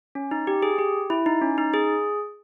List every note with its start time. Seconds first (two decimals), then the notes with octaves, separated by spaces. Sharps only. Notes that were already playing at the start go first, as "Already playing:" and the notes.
0.15 C#4
0.31 D#4
0.47 G4
0.62 G#4
0.78 G4
1.10 E4
1.26 D#4
1.42 C#4
1.58 D#4
1.74 G#4